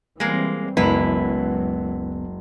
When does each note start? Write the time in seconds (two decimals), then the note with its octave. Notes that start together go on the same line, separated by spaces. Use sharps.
0.20 E3 G3 G#3 A#3 C4
0.77 F#1 C#2 F#2 F#3 G#3 B3 E4 B4